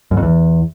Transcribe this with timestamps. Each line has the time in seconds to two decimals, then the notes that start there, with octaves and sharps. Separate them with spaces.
0.11 F#2
0.17 F2
0.23 E2